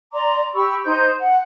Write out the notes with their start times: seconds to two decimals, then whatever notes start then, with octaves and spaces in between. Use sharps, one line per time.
0.13 D5 A#5 C6 D6
0.53 G4 B5 C#6 E6
0.84 D#4 C5 C6 G6
1.18 F#5